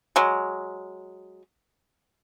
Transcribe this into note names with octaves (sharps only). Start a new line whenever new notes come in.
F#3 G#3